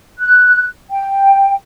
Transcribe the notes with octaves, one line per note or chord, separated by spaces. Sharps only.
F#6
G5